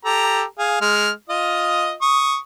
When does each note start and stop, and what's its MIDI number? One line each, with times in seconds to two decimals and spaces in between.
0.05 0.43 67
0.05 0.43 69
0.05 0.43 82
0.59 0.79 68
0.59 0.79 77
0.81 1.10 56
0.81 1.10 89
1.29 1.94 65
1.29 1.94 75
1.29 1.94 87
2.02 2.37 85
2.02 2.37 87